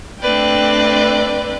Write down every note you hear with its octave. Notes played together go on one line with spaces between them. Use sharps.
A3 C4 D4 B4 D5 G5